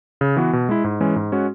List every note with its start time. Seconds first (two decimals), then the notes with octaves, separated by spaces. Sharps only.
0.21 C#3
0.37 E3 B3 F#4
0.53 B2
0.69 G#3 E4
0.84 G#2
1.01 E3 G#3 C#4
1.16 G#2
1.32 G#3 C#4 F#4